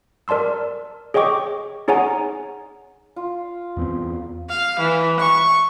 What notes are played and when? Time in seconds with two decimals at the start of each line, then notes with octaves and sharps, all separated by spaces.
0.28 A#4 D5 A5 C6 E6
1.14 G#4 C#5 D#5 G5 C#6 D6
1.88 D#4 G#4 C#5 F#5 G#5 A#5
3.16 F4
3.77 E2 B3 C4
4.49 F5
4.80 E3
5.20 C#6